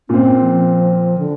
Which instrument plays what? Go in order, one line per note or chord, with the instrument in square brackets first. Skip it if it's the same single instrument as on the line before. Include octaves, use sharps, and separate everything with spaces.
[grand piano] A#2 C4 [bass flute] C#4
[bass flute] F3
D3